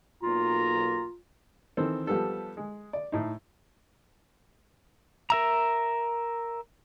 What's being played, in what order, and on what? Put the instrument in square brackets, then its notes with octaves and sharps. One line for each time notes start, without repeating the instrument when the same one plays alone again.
[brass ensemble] B1 A#3 A#5 [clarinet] F4
[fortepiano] D#3 E3 C4 A4
F3 G3 B3 G4 A4
G#3
D5
A2 D#4
[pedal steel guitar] A#4 E5 A#5